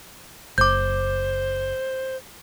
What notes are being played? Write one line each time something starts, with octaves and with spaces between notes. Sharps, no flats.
F#1 C5 D6 G6